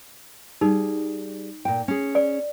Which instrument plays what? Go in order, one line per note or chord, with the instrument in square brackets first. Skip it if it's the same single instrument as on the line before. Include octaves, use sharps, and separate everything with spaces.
[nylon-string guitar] G3 G#4 [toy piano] D#4
[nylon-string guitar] A#2 G5
C#4 G#4
[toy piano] D5